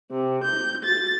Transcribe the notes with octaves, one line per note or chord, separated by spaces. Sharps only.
C3
G6
A6